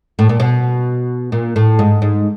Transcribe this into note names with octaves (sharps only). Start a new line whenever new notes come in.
A2
A#2
B2
A#2
A2
G#2
G#2